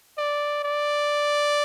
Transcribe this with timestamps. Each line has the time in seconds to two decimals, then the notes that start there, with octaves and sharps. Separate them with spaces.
0.18 D5
0.64 D5